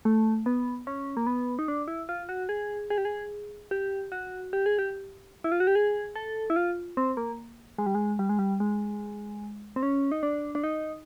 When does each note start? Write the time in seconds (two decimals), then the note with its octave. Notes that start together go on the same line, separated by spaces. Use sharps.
0.05 A3
0.46 B3
0.87 C#4
1.17 A#3
1.27 B3
1.59 D#4
1.68 D4
1.88 E4
2.09 F4
2.29 F#4
2.49 G#4
2.90 G#4
2.98 G4
3.05 G#4
3.71 G4
4.12 F#4
4.53 G4
4.66 G#4
4.79 G4
5.44 E4
5.52 F4
5.60 F#4
5.67 G4
5.75 G#4
6.16 A4
6.50 E4
6.56 F4
6.97 C4
7.17 A#3
7.78 G#3
7.86 G3
7.95 G#3
8.19 G3
8.29 G#3
8.39 G3
8.60 G#3
9.76 C4
9.83 C#4
10.12 D#4
10.23 D4
10.55 D4
10.64 D#4